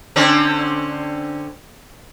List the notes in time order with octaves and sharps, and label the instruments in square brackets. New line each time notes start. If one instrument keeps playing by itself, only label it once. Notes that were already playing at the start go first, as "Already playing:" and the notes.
[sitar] D3 C4 C#4